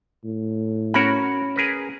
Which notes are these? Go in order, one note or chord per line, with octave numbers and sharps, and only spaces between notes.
A2
C#4 F#4 A#4 C#5 F#5 B5
G#4 A#4 B4